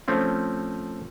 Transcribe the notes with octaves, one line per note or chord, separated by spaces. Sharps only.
F3 A3 C4 C#4